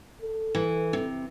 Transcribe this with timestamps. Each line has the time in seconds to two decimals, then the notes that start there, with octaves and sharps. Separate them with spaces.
0.22 A4
0.55 E3
0.93 C3